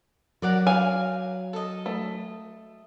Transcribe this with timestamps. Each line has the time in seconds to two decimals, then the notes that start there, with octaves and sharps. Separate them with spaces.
0.42 F#3 A#4 D5 F#5
0.67 F5 G#5
1.53 A4 D#5
1.86 A3